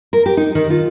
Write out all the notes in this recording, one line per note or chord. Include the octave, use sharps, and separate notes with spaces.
A#4
G4
D#4
D#3
F4